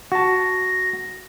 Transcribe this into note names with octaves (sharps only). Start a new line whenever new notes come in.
F#4 A5 A#6